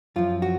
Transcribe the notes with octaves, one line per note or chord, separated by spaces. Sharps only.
F#2 F3 F4
F#4